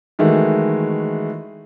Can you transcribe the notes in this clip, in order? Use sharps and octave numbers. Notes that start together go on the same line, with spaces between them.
D#3 E3 G#3 A3 F#4